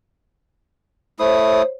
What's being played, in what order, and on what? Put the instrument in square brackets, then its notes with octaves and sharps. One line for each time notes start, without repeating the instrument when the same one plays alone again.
[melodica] A3 E4 D#6 [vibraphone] C5 C#5